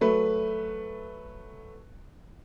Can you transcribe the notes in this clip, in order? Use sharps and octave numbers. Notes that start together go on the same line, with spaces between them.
F#3 A3 B4